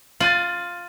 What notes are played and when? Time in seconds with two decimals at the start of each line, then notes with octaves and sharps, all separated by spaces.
0.20 F4 A6 D#7 F#7